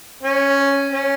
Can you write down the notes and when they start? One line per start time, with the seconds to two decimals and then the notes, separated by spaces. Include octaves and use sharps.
0.23 C#4
0.92 C#4